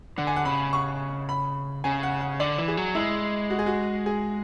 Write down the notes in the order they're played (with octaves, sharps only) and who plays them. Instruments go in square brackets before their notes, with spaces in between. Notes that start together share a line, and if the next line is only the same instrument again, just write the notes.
[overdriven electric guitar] D3 [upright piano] F#5
[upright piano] G#5
F#5
[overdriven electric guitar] C#3 [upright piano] B5
[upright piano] C#6
B5
[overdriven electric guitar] C#3 [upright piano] G#5
[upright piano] F#5
F#5
[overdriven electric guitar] D3 [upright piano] D5
[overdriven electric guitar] E3
[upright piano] G#4
[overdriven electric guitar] F#3
[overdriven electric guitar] G#3 [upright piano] E4
[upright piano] F#4
G#4
F#4
G#4